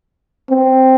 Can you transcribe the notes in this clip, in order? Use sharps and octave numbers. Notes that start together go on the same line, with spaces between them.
C4